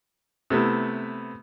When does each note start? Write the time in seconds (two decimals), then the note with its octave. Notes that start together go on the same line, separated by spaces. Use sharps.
0.50 C3 A3 B3 E4